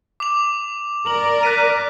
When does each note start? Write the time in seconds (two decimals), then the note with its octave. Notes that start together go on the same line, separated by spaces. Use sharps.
0.20 D6 F7
1.06 A#4 D5 F7 F#7
1.43 F#6 B6 D#7